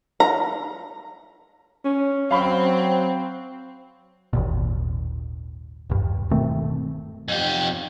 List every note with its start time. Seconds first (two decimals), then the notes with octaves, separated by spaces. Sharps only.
0.20 A#5
1.85 C#4
2.31 F#3 C4 F5 B5 C#6
4.33 G#1 D#2 A#2
5.90 D#1 G2
6.31 B2 D#3 A3 C4
7.28 F2 G4